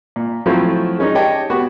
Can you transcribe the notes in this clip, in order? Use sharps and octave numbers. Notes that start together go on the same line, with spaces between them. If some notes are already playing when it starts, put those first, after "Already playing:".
A#2
F3 F#3 A3 C4 E4 F4
G#3 C#4 D#4
G4 C#5 D#5 G5 A5
B3 F#4 G4